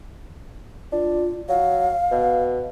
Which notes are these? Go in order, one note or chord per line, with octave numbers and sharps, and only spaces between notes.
D4 F4
F#3 F5
B2